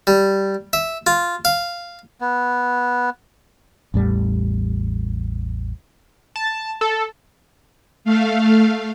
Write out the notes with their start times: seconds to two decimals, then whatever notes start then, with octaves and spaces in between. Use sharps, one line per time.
0.07 G3
0.73 E5
1.07 F4
1.45 F5
2.21 B3
3.94 A1 E2 A2 G3
6.36 A5
6.81 A4
8.04 A3 F5